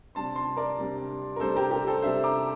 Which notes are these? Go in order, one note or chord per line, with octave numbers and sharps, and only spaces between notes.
C3 G3 D4 A5 C6
A5 C6
A#4 D5
C3 G3 D4
A#4
C3 G3 D4 A4 C5
G4 A#4
G4 A#4
A4 C5
C3 G3 D4 C5 E5
A#5 D6